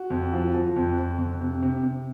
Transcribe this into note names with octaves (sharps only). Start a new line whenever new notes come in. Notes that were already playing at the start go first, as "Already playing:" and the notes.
Already playing: F#4
F2
F3
F3
F2
F2
F2
C3
C3
C3